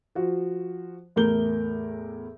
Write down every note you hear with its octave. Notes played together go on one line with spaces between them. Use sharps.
F3 F#4 C5
E2 A2 A3 A#4 G6 G7